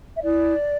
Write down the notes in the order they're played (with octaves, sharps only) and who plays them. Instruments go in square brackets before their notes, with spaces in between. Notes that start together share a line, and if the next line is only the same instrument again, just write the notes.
[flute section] E5
E4 D5